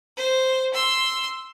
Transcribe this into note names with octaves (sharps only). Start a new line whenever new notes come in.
C5
C6 E6